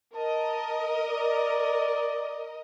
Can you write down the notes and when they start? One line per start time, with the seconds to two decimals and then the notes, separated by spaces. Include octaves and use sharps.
0.15 A#4 D#5 A5
1.07 D5